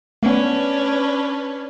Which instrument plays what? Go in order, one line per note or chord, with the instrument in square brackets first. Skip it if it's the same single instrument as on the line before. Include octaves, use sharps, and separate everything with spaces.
[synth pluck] A3 B3 [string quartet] C#4 D4 B4